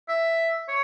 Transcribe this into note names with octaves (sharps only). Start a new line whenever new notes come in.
E5
C#5